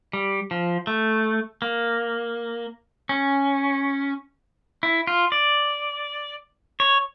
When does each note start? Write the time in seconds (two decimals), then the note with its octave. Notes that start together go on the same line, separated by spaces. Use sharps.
0.13 G3
0.51 F3
0.87 A3
1.62 A#3
3.09 C#4
4.83 E4
5.07 F4
5.32 D5
6.80 C#5